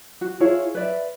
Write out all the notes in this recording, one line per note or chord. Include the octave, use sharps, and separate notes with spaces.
F#4
E4 F4 G#4 C#5
B4 D5 E5